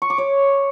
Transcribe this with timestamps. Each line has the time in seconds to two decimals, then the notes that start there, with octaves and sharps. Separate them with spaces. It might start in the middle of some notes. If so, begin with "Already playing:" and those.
0.02 C#6
0.10 D6
0.18 C#5